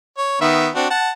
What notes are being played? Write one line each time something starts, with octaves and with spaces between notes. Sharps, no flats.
C#5
D#3 B3 E5
C4 D4 F#4
F#5 A5